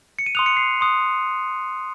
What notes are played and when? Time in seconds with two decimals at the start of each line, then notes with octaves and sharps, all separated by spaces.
0.19 C#7
0.26 D#7
0.35 C6 D#6 F#6 F7
0.46 C#7
0.57 C7
0.81 C6 D#6 F#6